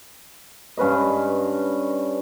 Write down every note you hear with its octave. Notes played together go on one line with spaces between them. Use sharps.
G2 C#4 B4 D#5